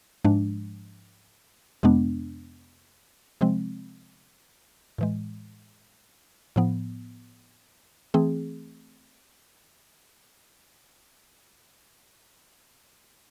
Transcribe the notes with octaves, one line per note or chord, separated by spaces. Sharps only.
G#2 F3 G#3 D4
F2 C3 G#3 B3 D4
C3 F3 G#3 C4
A2 E3 G#3
A2 F3 B3
E3 A3 C4 G#4